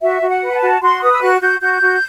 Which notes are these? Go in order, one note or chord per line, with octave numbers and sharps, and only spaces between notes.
F#4 E5
F#4
F#5
B4
B5
A5
F#4
F#4 C6
B4 D#6
E6
F#4 F#6
F#4 G6
F#4 G6
F#4